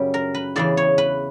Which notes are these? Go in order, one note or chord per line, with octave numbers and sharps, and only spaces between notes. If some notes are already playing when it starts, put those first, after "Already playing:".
Already playing: F#2 C#3 G3 G4
A#4
B4
E2 C#3 E3 D5
C#5
B4